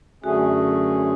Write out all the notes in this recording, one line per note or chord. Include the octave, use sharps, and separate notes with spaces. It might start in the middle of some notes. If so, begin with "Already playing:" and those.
F#2 D3 A3 C#4 F#4 G#4